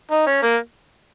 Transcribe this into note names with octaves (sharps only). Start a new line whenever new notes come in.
D#4
C#4
A#3